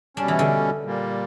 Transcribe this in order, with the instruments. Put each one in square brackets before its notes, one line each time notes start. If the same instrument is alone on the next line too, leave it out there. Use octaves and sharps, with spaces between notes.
[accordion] B2 G3 C#4 [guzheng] D4
[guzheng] E3
D3
[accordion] A#2 G3 A#3